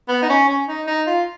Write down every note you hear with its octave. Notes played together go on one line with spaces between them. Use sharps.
B3
D#4
C#4
C#4
D#4
D#4
F4